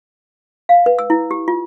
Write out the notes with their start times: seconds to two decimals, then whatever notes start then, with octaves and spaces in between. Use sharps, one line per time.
0.69 F5
0.86 B4
0.99 E6
1.10 E4
1.31 G4
1.48 F4